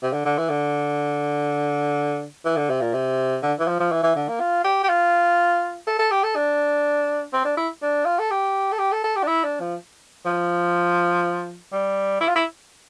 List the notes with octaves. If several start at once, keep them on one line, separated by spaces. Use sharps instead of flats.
C3
D3
D3
E3
D3
E3
D3
C3
A#2
C3
D3
E3
F3
F3
E3
E3
D3
A#3
F4
G4
G4
F4
A4
A4
G4
A4
D4
C4
D4
E4
D4
F4
A4
G4
A4
G4
A4
A4
G4
D4
E4
D4
F3
F3
G3
E4
F4
E4